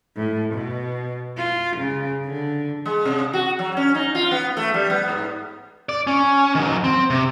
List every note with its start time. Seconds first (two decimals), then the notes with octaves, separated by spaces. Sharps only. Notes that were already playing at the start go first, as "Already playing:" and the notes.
0.17 A2
0.54 B2
1.37 F4
1.77 C#3
2.26 D3
2.86 G#3
3.05 C3
3.33 F#4
3.59 F#3
3.77 C#4
3.95 D#4
4.15 F4
4.31 B3
4.57 A3
4.74 G3
4.90 B3
5.08 G#2
5.89 D5
6.07 C#4
6.55 D#3 F#3
6.84 C4
7.10 C3